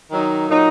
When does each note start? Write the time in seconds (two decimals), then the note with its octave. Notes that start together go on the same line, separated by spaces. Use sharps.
0.11 D#3 F#3 D#4
0.49 A#2 F#3 D#4